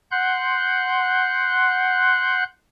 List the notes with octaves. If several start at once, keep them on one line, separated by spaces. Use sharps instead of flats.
F#5 C6 F#6 G6